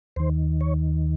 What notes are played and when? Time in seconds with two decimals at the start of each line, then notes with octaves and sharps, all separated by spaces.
0.16 D#2 D#3 C5
0.61 C#5